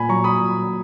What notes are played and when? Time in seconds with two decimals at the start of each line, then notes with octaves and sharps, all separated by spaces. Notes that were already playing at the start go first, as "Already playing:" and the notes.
Already playing: A#2 G#5 B5
0.09 F#3 A#5 C#6
0.24 B5 D#6
0.38 A#2